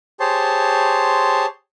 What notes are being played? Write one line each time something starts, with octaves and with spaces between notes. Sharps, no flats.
G4 G#4 C5 C#5 A5 C6